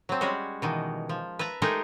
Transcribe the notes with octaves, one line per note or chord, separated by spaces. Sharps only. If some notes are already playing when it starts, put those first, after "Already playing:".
F#3 C4
G3 G#3 C#4 F#4
B2 D#3 E3
F3
B4 E5 A5 A#5
G#3 A3 D#4 G4 G#4 A#4